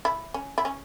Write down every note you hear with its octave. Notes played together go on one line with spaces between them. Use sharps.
E4
C#4
E4
C#4